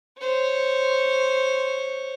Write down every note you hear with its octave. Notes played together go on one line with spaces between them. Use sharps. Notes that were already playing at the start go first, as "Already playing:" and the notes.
C5 C#5